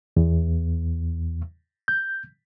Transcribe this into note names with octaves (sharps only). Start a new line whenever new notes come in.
E2
G6